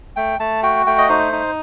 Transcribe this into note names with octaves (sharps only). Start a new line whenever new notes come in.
A3 G5
A3 A5
F#4 G5
A3 G5
D#5
D#4 C5
D#4